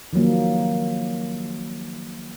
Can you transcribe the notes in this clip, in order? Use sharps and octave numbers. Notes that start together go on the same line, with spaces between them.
D#3 F3 F#3 A#3